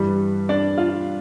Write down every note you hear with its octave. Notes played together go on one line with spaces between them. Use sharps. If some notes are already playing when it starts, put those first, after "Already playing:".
Already playing: G2 E3 G3
D4 D5
F4 F5